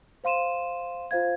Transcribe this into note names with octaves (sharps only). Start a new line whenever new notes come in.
C5 F5 C6 D#7 E7
F4 C5 F5 G#6